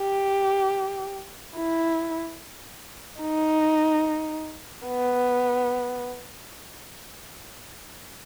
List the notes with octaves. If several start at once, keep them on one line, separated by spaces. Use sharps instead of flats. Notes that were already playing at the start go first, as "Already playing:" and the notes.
Already playing: G4
E4
D#4
B3